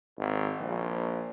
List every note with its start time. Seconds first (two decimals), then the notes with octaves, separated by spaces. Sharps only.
0.18 G#1
0.60 A#1